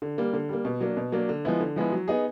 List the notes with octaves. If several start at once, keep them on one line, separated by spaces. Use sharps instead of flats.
D3
G3 A#3
D3
G3 A#3
B2
F#3 A#3 D4
B2
F#3 A#3 D4
D3
F3 G#3 B3 E4
D3
F3 G#3 B3 E4
F#3
B3 D#4 G#4